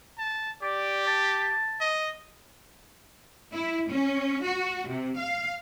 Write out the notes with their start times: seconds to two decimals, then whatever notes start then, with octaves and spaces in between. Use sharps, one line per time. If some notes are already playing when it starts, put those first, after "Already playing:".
0.18 A5
0.62 G4 D5
1.07 A5
1.80 D#5
3.53 E4
3.89 C#4
4.44 F#4
4.88 C3
5.18 F5